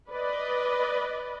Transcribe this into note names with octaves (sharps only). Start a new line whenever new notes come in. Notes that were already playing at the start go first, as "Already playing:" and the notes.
B4 D5 D#5